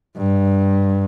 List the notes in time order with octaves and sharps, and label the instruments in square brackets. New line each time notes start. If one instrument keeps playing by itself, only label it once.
[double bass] G2